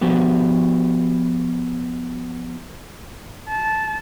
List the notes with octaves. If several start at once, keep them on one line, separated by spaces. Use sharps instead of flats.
F3 B3 F#4 G4
A5